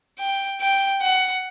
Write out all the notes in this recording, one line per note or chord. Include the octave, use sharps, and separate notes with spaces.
G5
G5
F#5